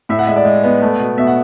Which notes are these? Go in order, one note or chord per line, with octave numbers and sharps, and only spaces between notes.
A2 E5
F#5
G#3 E5
D5
G#3
B3
A3
B2
B2 E5
F#5